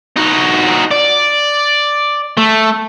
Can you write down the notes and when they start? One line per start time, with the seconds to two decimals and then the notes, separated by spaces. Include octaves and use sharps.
0.17 D#4 F#4
0.91 D5
2.37 A3